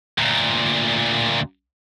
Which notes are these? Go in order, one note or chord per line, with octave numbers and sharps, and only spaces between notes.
D2 A#2